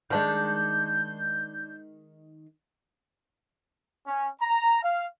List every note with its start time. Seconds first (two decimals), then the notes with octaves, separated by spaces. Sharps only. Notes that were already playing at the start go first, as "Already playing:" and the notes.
0.10 D#3 G3 G#3 D4 G6
4.06 C#4
4.42 A#5
4.83 F5